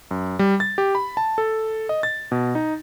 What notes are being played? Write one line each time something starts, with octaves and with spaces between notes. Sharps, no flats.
F#2
G3
A6
G4
B5
A5
A4
D#5
A6
B2
D#4